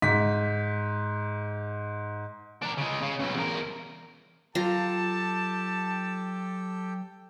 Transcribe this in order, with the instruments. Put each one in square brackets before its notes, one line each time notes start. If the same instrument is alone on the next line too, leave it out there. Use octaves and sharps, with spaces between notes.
[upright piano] G#2 B6
[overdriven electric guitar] D4 A#4
C#3 G#3
C#3
B1 C#3
E2 A#4
[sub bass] F#3 [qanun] F4 A#5 [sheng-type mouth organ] G4 A4 G5 [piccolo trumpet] A5